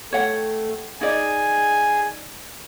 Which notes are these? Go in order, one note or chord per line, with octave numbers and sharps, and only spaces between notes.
A3 C#5 F#5 G5
D#4 G#4 D5 D#5 G#5